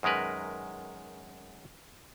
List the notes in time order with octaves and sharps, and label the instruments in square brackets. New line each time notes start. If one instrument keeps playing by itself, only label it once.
[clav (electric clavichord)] F#2 D#3 G#3 A#4 B4